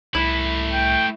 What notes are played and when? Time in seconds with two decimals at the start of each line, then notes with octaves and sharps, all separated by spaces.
0.15 C2 A3 E4 B4
0.72 G5